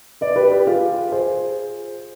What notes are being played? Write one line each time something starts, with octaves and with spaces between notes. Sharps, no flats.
B4 D5
G4 B4
G4 B4
F4 G#4
G#4 C5